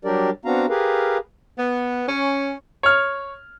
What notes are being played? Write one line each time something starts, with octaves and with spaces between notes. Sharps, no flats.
F#3 G3 D4 G4 A#4 D5
B3 C4 D4 F#4 F5 A#5
G4 G#4 A#4 B4 F5
B3
C#4
C#5 F6